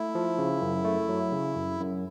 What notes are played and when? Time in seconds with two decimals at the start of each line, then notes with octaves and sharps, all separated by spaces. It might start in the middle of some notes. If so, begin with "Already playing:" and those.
Already playing: A3 E4
0.15 F3
0.38 C#3
0.62 F#2
0.85 A3
1.09 F#3
1.32 C#3
1.56 F#2
1.80 F#2